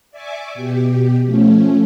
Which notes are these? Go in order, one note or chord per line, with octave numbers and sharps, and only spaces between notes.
D5 E5 G#5 C#6 D6
B2 G4
F3 A3 C#4